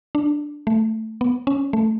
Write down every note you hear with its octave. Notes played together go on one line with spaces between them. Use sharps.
D4
A3
B3
C#4
A3